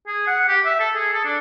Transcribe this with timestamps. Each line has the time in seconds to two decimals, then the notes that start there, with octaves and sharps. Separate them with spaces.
0.07 G#4
0.27 F#5
0.48 G4
0.65 E5
0.80 A4
0.95 G#4
1.13 A4
1.25 D4